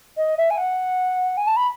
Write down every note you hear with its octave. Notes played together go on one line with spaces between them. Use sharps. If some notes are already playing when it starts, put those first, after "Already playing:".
D#5
E5
G#5
F#5
G#5
A5
B5